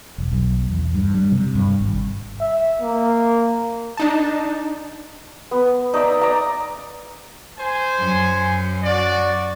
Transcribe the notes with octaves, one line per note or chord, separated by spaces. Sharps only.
E1
B1
E2
G2
G3
C3
G2
G#1
E5
A#3
D4 D#4 A5
B3
D#4 D5 E5
D5 A#5
C5 G#5
F#2
F#4 D5